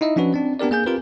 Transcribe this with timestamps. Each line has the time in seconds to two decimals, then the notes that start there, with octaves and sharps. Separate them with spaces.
0.01 D#4 E4 D#5 E5
0.16 F3 C#4 D4 F#4 B4
0.34 C4 D4
0.59 B3 D4 G4 A#4 D5
0.71 A#3 G#4 G#5 G6
0.86 C4 F4 G4 A#4 B4